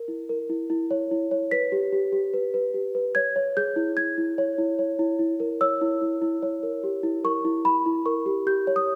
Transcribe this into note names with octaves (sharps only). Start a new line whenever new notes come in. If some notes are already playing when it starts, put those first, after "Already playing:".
Already playing: A#4
E4
A#4
E4
E4
C#5
E4
C#5
B4 B6
G4
G4
G4
B4
B4
G4
B4
C#5 G#6
C#5
G#4 G6
E4
E4 G#6
E4
C#5
E4
C#5
E4
E4
A#4
C#5 E6
E4
E4
E4
C#5
A#4
G4
E4
A#4 C#6
E4
E4 B5
E4
A#4 C#6
G4
G4 G6
C#5
D#6